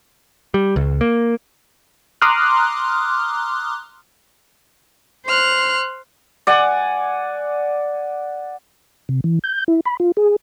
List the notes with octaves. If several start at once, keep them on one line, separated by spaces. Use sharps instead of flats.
G3
C#2
A#3
A#5 C6 D6 D#6 F6 F#6
C5 C6 F6 F#6
D5 F#5 G#5
C3
E3
G6
E4
B5
F4
G#4